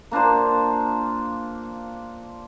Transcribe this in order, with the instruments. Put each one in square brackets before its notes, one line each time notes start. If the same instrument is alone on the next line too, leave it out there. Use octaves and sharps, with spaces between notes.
[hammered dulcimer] A#3 D4 F4 C5